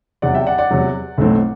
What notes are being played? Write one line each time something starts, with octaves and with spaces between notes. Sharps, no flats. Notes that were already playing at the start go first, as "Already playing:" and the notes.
E2 C3 F#3 D5 F#5
E5 G5
D5 F#5
D5 F#5
E2 C3 F#3
B1 A2 E3 A3 C4